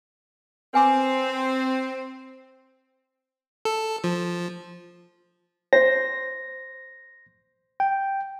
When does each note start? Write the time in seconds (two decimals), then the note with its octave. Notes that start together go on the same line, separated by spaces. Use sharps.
0.74 C4 B4 G#5 D6
3.65 A4
4.04 F3
5.73 C5 A#6
7.80 G5